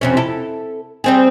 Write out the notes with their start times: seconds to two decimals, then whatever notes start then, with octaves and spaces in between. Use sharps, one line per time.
0.01 F2 C3 C#4
0.17 E4 A4
1.04 G3 C4 G#4